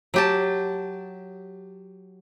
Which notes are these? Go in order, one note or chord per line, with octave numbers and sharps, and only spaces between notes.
F#3 G4 A5